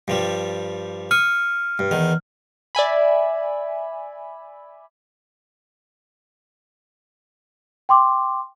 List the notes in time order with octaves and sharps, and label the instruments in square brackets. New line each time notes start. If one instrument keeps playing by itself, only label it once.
[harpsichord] G2 F3 G3
[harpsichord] C#6 D#6 [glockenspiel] F6
[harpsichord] G2
E2 D#3
[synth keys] D5 E5 G#5 B5
[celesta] G5 C6 D6